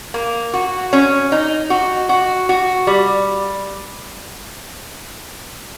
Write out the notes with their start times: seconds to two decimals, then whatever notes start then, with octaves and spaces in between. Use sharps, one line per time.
0.14 A#3
0.54 F#4
0.93 C#4
1.32 D#4
1.70 F#4
2.09 F#4
2.49 F#4
2.87 G3